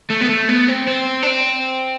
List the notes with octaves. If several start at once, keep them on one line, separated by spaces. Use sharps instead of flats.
A3
B3
A3
B3
C4
C4
D4
C4